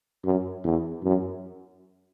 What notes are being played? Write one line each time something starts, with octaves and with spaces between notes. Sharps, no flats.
F#2
E2
F#2